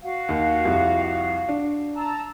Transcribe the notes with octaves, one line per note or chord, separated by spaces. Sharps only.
F#4 F5 F#5
D#2
C2 F2 G4
D4
A5 A#5 E6